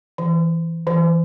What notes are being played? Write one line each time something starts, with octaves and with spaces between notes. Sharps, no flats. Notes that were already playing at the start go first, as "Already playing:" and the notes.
E3
E3